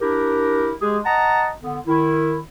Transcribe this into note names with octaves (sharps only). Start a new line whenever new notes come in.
D4 E4 G4 A#4
G#3 G4 G#4
D#5 F#5 A5 A#5
D3 B3
D#3 E4